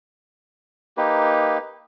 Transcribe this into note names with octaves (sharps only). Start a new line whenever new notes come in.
A#3 D#4 G4 B4